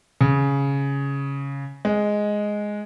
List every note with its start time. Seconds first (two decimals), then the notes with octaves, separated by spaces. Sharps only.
0.21 C#3
1.85 G#3